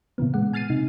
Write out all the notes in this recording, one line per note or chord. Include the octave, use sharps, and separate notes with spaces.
A#2 C#3 E3 B3
G#3 F#5
G#5 F6 A6 C7 D#7
C3 D#4